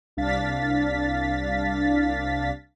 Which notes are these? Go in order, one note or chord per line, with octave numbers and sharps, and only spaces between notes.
C2 D4 F5 A6 B6